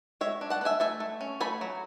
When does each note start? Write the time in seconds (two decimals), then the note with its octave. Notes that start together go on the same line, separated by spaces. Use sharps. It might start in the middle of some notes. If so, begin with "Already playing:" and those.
0.21 G#3 C#5 E5
0.41 D4
0.50 F#5 A5
0.61 B3
0.65 E5 G#5
0.80 A3 E5 G#5
1.00 A3
1.21 C#4
1.40 A3 G#5 B5
1.61 F#3